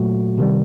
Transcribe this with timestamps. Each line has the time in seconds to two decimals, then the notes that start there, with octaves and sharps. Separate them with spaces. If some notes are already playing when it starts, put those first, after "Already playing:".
Already playing: A#2 F#3 A3 F#4
0.38 C3 D#3 G3